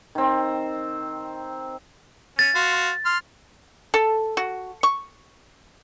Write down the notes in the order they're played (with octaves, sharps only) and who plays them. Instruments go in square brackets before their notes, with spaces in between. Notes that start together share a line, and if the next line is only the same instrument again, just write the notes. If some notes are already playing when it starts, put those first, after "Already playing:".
[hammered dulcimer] D#3 C4
[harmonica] C#4 [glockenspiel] A6
[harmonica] F#4 F5 C6
C6 F6
[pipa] A4
F#4
C#6